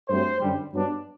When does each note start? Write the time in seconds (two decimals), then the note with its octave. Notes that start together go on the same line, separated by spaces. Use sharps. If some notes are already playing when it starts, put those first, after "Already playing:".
0.09 G2 F#3 A3 C4 C5
0.41 F#2 D3 G3
0.72 G2 F#3 B3 D4